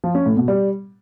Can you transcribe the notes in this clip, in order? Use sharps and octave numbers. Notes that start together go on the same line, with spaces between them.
F3
C#4
A2
B2
G3